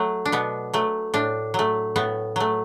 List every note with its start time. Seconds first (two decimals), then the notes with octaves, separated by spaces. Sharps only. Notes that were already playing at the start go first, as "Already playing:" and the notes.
Already playing: F#3 A3
0.25 D4
0.32 B2 B3
0.74 F#3 A3
1.14 A2 D4
1.54 F#3 A3
1.96 A2 B3
2.36 F#3 A3